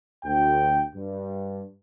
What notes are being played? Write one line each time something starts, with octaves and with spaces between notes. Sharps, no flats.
D2 G5
G2